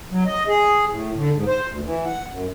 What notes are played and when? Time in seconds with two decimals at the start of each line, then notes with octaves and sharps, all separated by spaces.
0.11 F#3
0.26 D#5
0.47 G#4
0.89 A2
1.15 D3
1.33 G#2
1.46 C5
1.67 D2
1.84 E3
2.05 F#5
2.29 F#2